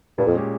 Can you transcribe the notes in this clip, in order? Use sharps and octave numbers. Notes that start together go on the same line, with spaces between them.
G2 A#2
F2
G#3 C#4 G4